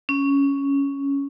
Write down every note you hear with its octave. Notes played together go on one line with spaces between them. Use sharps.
C#4